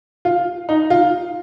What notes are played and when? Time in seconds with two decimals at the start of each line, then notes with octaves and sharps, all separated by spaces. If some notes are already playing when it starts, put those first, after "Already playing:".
0.25 F4
0.69 D#4
0.90 F4